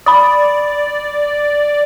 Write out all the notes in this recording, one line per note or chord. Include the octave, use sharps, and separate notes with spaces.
D5 B5 D#6